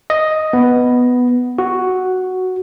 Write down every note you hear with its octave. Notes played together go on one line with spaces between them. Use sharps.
D#5
B3
F#4